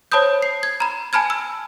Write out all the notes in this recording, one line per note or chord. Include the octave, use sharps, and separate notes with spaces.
C5 C#5 A5 B5 D#6 G6
C7
G#6
A#5 B5
G#5 A5 B5 F6 G#6
E6